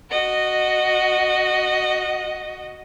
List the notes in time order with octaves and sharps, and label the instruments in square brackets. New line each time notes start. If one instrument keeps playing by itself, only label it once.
[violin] F#4 D#5